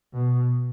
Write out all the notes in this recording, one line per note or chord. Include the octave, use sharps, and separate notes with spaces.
B2